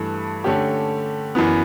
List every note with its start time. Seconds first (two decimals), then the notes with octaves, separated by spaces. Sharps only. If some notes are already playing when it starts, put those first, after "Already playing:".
Already playing: G2 E3 A3 E4
0.44 D3 A3 C#4 G4
1.35 F#2 E3 B3